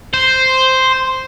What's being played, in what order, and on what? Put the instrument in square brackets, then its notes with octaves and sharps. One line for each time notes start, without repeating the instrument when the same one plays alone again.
[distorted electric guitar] C5